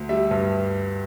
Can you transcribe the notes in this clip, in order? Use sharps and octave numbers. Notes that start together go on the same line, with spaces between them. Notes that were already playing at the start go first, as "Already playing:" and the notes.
Already playing: D2
G3 E5
G2